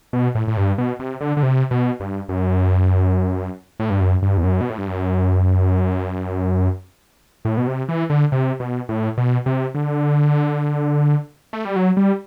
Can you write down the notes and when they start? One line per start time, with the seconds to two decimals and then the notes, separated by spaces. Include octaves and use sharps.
0.13 B2
0.35 A2
0.47 A2
0.57 G2
0.78 B2
0.99 C3
1.21 D3
1.37 D3
1.43 C3
1.71 B2
2.00 G2
2.29 F#2
3.80 A2
3.90 G2
4.00 F#2
4.22 G2
4.37 E2
4.44 F#2
4.61 B2
4.70 A2
4.78 G2
4.88 F#2
7.45 A2
7.57 B2
7.67 C3
7.89 E3
8.10 D3
8.32 C3
8.60 B2
8.89 A2
9.18 B2
9.46 C3
9.75 D3
11.53 A3
11.65 G3
11.76 F#3
11.97 G3